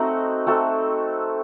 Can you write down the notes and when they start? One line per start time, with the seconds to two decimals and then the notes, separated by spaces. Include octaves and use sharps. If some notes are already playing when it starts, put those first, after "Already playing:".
Already playing: A3 C4 D#4 F#4
0.47 A3 C4 F#4 A4